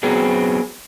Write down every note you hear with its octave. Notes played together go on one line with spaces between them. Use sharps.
F#3 B3 C4 G#4